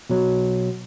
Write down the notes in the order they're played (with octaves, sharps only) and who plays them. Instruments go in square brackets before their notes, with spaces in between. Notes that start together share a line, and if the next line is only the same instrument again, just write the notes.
[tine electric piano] B2 F#3